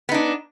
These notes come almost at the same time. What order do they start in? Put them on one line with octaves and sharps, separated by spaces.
B3 D#4 D4